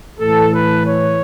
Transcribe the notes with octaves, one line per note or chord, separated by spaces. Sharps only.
A2 E3 A4
B4
C#5